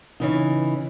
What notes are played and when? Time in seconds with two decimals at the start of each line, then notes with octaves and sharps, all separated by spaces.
0.20 C#3 E3 D#4